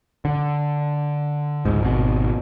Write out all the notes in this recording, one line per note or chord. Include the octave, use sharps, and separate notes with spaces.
D3
C#2 G#2
G#1 B2